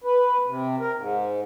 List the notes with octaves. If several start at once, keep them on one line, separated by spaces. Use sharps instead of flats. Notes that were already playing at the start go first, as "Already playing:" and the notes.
B4
C3
A#4
G#2